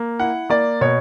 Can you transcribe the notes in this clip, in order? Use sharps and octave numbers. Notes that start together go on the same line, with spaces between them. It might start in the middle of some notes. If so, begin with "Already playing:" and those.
Already playing: A#3
E4 F#5
A#3 D5
B2 C#5